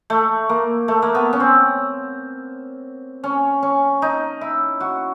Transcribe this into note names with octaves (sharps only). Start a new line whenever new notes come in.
A3
A#3
A3
A#3
B3
C#4
C4
C#4
C#4
D#4
E4
F#4